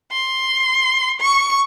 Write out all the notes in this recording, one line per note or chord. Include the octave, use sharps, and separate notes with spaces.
C6
C#6